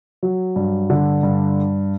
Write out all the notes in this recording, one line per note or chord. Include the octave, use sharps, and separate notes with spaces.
F#3
G2
D3
G2